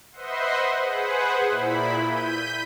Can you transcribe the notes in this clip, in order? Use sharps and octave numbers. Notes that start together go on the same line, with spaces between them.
B4 C5 D#5 E5 F#5 C6
G#4 B4 C5 F#5
A#2 E4 B5
G6 B6 D#7